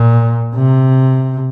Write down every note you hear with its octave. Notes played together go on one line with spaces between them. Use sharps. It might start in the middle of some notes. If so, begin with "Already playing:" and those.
Already playing: A#2
C3